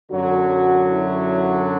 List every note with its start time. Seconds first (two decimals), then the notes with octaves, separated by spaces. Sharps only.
0.11 F#2 D3 F#3 F#4
0.90 E4